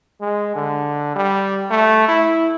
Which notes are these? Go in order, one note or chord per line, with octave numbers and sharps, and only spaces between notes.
G#3
D3
G3
A3
E4